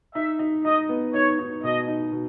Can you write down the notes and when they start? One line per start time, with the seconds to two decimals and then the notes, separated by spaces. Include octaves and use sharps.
0.15 D#4 E5
0.39 D#4
0.65 D#4 D#5
0.89 B3
1.14 D#4 C#5
1.39 D#4
1.63 B2 D#5
1.88 D#4
2.12 B2